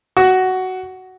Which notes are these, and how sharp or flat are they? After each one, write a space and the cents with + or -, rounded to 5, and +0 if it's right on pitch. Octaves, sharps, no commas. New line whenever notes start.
F#4 +10